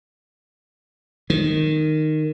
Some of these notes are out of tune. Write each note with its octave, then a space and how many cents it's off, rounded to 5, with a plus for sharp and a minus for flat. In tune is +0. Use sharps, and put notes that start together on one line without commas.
D#3 -10